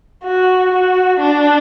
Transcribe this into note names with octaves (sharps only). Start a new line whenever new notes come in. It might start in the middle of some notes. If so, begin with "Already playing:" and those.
F#4
F#4
D4